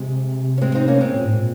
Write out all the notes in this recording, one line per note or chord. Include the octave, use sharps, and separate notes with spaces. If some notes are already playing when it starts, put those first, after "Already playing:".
Already playing: C3 G#3
C#4
G#3 C4
C4 D#4
A#3 C#4
G#3 C4
A#2
G#2
A#2